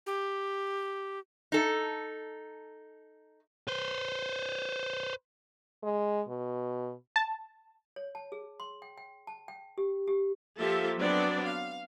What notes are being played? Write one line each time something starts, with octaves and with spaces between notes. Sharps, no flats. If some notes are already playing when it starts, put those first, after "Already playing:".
G4
D#4 A4
B4 C5
G#3
B2
A5
C#5
A5
G#4
C6
G5
G5
A5
G5
G4
G4
F3 A#3 F4 G4 A4 E5
F#3 B3 C4 D4 D5
F5